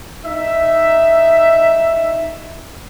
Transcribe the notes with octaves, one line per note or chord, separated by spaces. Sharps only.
D#4 E5